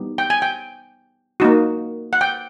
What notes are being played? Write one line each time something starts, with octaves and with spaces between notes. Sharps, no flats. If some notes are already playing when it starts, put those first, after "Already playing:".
Already playing: G3 B3 D#4 G4
G5
G#5
G5
A#3 D#4 F#4
F#5
G5